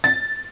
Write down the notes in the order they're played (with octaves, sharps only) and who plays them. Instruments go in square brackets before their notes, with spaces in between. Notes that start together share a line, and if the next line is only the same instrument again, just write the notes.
[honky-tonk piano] A6